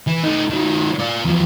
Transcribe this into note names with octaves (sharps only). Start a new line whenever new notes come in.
E3
A3 D#4
D#3 F#3
F4 D5
E2 F3